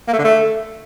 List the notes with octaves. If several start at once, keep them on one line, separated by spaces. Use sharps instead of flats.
A#3
A3
D3
A3